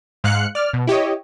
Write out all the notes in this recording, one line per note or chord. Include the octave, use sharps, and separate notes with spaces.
G#2 F5 F#6 C#7
D5 F6
B2
E4 G4 C#5 D#5